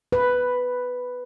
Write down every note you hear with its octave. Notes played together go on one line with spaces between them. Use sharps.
B4